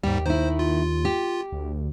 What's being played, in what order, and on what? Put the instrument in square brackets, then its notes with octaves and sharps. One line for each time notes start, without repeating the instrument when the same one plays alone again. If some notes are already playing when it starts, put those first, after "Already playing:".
[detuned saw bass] D#2 [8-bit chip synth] G#2 G3 [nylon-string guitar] G4
[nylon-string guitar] D#3 E4 [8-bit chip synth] C5
[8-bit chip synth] F4
[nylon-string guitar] G4
[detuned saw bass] D2